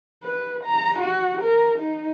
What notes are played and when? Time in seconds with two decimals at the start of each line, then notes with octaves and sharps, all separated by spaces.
0.24 B4
0.64 A#5
1.00 F#4
1.42 A#4
1.79 D#4